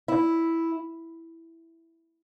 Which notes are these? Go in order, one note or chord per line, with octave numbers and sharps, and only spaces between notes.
E4